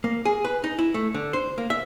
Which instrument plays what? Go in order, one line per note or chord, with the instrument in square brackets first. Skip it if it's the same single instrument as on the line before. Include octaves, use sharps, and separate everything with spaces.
[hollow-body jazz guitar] A#3
G#4
B4
D#4
E4
A3
D3
C5
A#3
E5